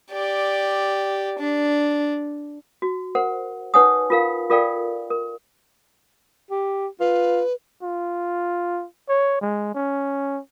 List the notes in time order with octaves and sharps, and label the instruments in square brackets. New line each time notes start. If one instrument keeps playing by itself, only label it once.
[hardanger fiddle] G4 D5
D4
[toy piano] F#4
A#4 C5 F#5
D#4 B4 C#5 F#5 G#5 D#6
F4 A#4 F5
F4 A4 A#4 D5 F5 G5
A#4
[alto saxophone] G4
[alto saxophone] F4 [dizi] B4
[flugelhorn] F4
C#5
G#3
C#4